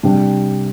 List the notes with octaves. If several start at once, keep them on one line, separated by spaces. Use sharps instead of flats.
C3 G3 D4 G4